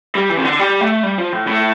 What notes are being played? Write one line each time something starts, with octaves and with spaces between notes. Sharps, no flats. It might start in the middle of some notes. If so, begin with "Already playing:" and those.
G3
E3
C3
D3
G3
A3
G3
F3
A2
A2